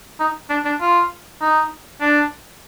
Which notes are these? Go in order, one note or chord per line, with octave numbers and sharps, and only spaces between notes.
D#4
D4
D4
F4
D#4
D4